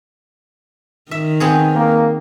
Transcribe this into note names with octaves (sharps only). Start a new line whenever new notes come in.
D#3 E5
B3 C4 G#4
A#3